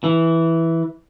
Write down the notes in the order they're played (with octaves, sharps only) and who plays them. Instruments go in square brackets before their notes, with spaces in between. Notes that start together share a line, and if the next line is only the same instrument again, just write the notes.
[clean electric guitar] E3